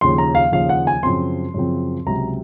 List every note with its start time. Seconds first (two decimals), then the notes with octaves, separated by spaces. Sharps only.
0.01 D#2 C#3 F3 C6
0.18 A#5
0.35 F5
0.52 D#2 C#3 F3 F5
0.69 F#5
0.87 G#5
1.03 F#2 C#3 F3 C4 C6
1.54 F#2 C#3 F3 C4
2.06 C#2 C3 F#3 A#5